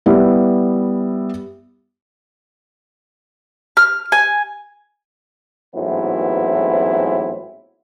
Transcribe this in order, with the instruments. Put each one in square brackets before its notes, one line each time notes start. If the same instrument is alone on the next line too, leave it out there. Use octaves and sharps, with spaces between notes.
[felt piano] G3 B3 E4
[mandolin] F6
G#5
[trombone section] A1 G#2 F#3 B3 C4 E4